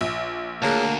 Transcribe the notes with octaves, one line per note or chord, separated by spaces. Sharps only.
A#1
D2 A#3 G#4 C#5 A5